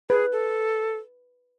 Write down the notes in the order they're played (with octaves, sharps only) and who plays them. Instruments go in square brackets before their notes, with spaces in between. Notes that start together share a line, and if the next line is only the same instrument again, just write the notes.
[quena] G#4 [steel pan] B4
[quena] A4